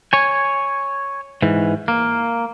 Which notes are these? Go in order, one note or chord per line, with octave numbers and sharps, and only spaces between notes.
C#5 G#5
G#2 E3
A#3